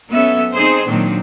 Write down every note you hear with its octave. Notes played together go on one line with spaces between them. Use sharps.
F#3 B3 C#4 A4 E5
C4 D#4 G#4 C5
A#2 D#3 F#3 C4 D4